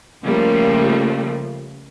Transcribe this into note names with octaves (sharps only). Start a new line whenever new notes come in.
C#3 F3 G3 A3 A#3